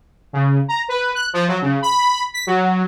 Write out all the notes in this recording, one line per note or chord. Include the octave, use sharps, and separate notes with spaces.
C#3
A#5
B4
F#6
F3
F#3
C#3
B5
B6
F#3